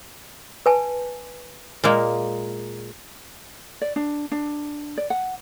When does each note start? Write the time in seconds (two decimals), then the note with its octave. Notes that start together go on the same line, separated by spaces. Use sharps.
0.66 B4 G#5 A5
1.84 A#2 G#3 A#3
3.81 D5
3.96 D4
4.32 D4
4.97 D5
5.10 F#5